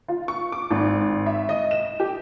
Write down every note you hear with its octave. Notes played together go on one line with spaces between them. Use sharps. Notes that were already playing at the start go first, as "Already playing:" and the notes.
F4
C#6
D6
G#1
E5
D#5
E7
G4